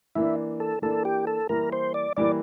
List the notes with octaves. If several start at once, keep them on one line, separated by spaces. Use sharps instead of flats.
E3 A#3 D4 E4
A4
E3 A#3 D4 A4
G4
A4
E3 G3 A#3 E4 A#4
C5
D5
E3 G3 A#3 E4 D5